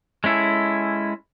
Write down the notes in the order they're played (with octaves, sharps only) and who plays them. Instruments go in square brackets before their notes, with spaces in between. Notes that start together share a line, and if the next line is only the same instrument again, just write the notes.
[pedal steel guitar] G#3 C#4 E4 A4